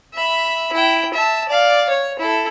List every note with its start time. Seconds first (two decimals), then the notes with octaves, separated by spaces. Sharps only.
0.14 E5 B5
0.72 E4 G5
1.14 E5 A5
1.48 D5 F5
1.89 C#5
2.19 E4 A4